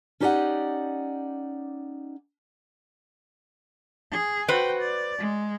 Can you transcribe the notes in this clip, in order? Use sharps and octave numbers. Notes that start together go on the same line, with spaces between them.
C#4 D#4 G4 D5 D#5 F#5
G#4
F#4 B4 C5 G5
D5
G#3